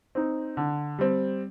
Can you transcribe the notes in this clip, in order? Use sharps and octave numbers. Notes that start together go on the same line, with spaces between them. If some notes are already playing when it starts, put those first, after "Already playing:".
C4 D#4
D3
G3 C4